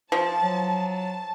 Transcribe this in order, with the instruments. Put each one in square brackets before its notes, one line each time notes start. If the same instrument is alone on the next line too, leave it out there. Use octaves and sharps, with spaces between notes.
[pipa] F3 [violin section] A5
[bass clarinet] F#3
[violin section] A5